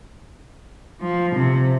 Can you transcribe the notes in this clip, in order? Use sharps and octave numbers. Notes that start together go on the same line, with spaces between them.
F3
C3